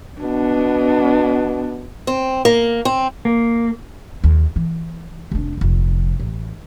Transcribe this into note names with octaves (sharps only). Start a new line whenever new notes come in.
B2 B3 D4
C4
A#3
C4
A#3
D#2
E3
F1 D4
F1 A#1
A1